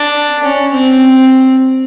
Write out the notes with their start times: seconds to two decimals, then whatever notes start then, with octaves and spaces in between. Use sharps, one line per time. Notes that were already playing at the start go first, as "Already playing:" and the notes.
Already playing: D4
0.43 C#4
0.73 C4